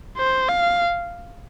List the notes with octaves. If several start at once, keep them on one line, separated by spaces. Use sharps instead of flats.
C5
F5